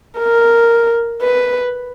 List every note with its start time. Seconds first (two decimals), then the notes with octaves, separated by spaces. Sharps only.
0.19 A#4
1.22 B4